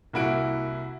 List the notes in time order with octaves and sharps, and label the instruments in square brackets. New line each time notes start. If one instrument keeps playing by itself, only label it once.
[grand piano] C2 A#3 E4 F#4 D7